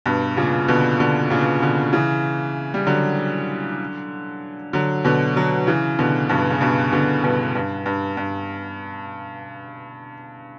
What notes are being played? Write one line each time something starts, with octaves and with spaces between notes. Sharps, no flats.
G2 B2
A#2 C#3
B2 D3
B2 D3
A#2 C#3
B2 D3
C#3 E3
G3
D3 F#3
D3 F#3
B2 D3
D3 F#3
C#3 E3
B2 D3
G2 B2
C#3
G2 B2
B2 D3
G2 B2
G2
G2
G2